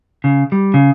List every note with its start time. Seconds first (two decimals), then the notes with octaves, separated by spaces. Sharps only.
0.24 C#3
0.52 G3
0.74 C#3